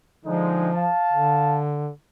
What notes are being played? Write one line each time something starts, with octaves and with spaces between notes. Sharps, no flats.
D3 F3 G#3 D#4
F5 A5
D3